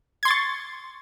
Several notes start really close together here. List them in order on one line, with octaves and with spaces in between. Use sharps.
G#6 C6 A6 C#6